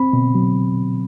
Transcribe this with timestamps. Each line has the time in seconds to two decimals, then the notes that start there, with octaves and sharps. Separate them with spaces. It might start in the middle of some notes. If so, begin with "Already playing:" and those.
Already playing: C4 B5
0.13 B2
0.35 F#3